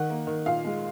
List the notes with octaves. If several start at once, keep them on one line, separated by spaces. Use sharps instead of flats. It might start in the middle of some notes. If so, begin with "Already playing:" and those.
Already playing: D#3 F#5
A#3
D#3
A#2 F5
G#3